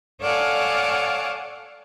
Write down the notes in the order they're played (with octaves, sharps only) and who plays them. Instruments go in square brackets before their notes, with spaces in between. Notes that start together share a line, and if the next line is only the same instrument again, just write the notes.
[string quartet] A4 C#5 D5 F5 F#5 G#5